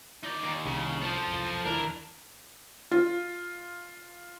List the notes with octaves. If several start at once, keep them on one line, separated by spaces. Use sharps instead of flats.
D#4 D5
D#2
C2 C#3
F3 A4 C5
E1 C2 F#2
E1 D#2 E3 D4 E4 A#4
F4